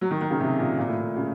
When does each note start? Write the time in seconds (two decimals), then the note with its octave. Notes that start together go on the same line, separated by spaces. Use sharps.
0.01 F#3
0.11 D#3
0.21 D#3
0.30 C#3
0.40 C3
0.59 A#2
0.78 A#2
0.87 A2
0.97 A#2
1.17 C#3